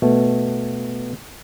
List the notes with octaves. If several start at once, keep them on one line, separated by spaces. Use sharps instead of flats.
B2 A3